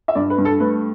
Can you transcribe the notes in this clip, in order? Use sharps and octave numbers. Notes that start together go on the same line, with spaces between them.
E5
G2 D5
B4
G2
A4
A3 B4